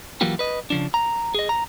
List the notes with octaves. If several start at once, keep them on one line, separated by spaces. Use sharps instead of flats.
E3 F#3 A#3 F4 G4
B4 D#5
C#3 F3 D4
A#5
G#4 D#5
A#5